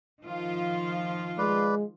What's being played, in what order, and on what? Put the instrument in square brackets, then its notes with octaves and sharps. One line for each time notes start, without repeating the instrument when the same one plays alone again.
[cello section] D#3 F3 F4
[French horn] G#3 [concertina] B4 D5